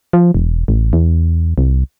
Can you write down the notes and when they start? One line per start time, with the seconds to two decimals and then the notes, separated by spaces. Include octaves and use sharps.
0.13 F3
0.34 E1
0.68 A1
0.93 E2
1.58 C2